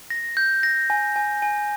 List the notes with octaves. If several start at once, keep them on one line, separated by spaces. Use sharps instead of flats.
A#6
G6
A#6
G#5
G#5
G#5